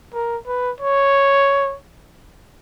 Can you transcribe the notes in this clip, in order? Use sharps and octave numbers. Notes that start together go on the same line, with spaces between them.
A#4
B4
C#5